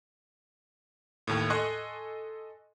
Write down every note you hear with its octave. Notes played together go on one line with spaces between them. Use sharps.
D#2 A2
A4 D#5 G#5 C6 C#6 F#6